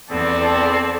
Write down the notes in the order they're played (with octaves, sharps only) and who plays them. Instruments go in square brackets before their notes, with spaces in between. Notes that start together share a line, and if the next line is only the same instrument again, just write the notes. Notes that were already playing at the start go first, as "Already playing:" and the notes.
[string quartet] E2 [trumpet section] B3 C4 [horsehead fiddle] A4 D5